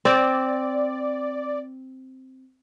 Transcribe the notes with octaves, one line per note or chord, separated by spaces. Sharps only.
C4 D5